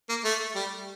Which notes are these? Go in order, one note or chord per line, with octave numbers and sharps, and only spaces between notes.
A#3
A3
G3